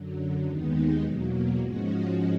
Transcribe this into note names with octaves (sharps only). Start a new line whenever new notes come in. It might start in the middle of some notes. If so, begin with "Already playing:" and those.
Already playing: F#2 D3 F#3
D#2 D#3 G#3 B3 D#4
E2 B2 F#3 A#3
G#2 F3 G#3 C#4 F#4